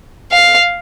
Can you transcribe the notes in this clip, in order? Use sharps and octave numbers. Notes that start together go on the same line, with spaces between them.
F5